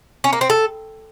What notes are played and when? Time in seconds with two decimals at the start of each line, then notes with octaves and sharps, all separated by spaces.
0.24 C#4
0.33 A#3
0.41 C4
0.50 A4